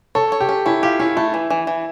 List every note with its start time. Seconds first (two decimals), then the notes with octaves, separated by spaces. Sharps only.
0.15 A4 C#5
0.32 C#5
0.40 G4
0.49 C#4
0.66 C#4 E4
0.83 F4 G4
1.00 C#4 E4
1.17 A3 E4
1.34 E3
1.50 E3
1.67 E3